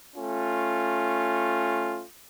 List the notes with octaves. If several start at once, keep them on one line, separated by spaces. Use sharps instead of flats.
A3 C#4 F4